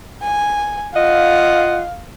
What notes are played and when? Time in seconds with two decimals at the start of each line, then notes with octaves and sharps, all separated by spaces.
0.23 G#5
0.95 F4 D#5 F5 F#5